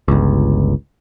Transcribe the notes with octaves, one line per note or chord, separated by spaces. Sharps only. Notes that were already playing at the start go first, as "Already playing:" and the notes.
G1 C#2